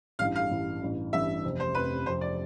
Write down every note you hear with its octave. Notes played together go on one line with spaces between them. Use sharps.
A1 G2 E3 F5
F5
A1 G2 E3
A1 G2 E3
A1 G2 E3 E5
F1 F2 C3
C5
F1 F2 C3 B4
F1 F2 C3 C5
D5